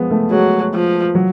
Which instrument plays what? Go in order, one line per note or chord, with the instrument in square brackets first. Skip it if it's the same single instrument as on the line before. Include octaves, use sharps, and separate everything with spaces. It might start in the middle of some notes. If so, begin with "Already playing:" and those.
Already playing: [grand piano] F3 G#3 B3
A3
[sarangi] F#3 [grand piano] G#3
[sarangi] F3
[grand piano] F#3